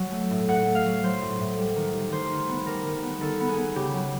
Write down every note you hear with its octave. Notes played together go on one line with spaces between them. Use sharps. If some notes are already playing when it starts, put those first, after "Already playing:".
Already playing: F#3
A3
A2
A2 F#5
A3
F5
F#3
F#3 C5
A2
A2
G3
D#3
G3
D#3 C5
D#3
B3
G3 A#4
D#3
B3
D#3 A4
B3
G#4
B3
C#3 G4
F#3